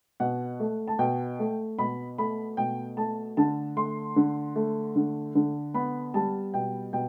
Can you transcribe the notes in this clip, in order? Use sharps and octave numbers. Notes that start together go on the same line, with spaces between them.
B2 F#5
A3
A5
B2 G5
A3
B2 B5
A3 B5
B2 G5
A3 A5
D3 A5
A3 C6
D3
A3
D3
D3
B3 B5
G3 A5
B2 G5
B2 G5